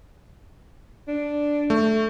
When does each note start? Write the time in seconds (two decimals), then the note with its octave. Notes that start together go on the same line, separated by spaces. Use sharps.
1.08 D4
1.70 A3